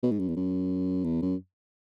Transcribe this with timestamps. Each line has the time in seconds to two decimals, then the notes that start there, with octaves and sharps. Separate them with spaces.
0.03 B2
0.12 G#2
0.19 F#2
0.28 E2
0.37 F#2
1.04 E2
1.22 F#2